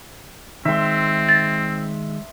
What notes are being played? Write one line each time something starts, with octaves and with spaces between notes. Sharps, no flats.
D#3 G#3 C4 E5 C6
A6